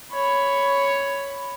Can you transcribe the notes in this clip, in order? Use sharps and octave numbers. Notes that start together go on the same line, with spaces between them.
C#5 B5